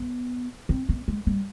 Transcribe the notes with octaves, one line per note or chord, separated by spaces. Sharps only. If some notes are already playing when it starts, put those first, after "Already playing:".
Already playing: B3
C4
B3
G#3
G3